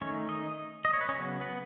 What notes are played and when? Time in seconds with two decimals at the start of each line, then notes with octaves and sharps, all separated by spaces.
0.01 D#3 A3 C#4 D#4 C#5
0.29 D#4 D#5
0.85 D#5
0.93 C#5
1.01 B4
1.09 C#4 C#5
1.14 C#3 F#3 B3
1.41 B3 B4